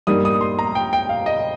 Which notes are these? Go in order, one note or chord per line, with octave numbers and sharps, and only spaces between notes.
G2 G3 A#3 D#4 D#6
D#6
C6
A#5
G5
G5
F5
D#5